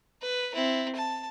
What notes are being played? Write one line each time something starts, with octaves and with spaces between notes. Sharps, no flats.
B4
C4 E4
A5